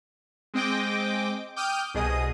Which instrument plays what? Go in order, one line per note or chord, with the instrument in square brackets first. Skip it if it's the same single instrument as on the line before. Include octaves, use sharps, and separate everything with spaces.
[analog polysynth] G#3 C4 D#5 G5 D6
G5 D6 D#6 F6 G6 D#7
C2 B2 G#4 D#5 D#6